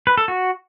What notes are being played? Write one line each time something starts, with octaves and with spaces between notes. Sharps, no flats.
B4
A4
F#4